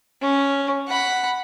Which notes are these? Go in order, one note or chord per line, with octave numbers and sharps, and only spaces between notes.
C#4
F#5 B5